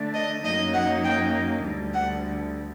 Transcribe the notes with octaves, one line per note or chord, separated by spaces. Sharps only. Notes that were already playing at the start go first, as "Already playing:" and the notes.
Already playing: D3 A3 D4
D#5
F#2 F#3 A#3 D#4 D#5
F#5
G5
D2 D3 G3
F#5